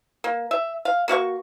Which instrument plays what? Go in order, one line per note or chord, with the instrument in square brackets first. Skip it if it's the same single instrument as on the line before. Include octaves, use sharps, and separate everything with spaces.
[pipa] A#3
E5
F5
A#3 F#4 F5 C#6